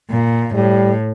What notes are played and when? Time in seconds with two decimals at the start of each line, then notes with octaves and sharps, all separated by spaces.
0.11 A#2
0.54 A2 G3